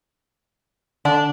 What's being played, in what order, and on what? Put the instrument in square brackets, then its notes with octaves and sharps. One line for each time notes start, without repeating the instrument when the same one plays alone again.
[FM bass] D3 [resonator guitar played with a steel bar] D4